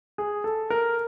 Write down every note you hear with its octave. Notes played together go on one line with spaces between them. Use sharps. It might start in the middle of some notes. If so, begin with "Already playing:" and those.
G#4
A4
A#4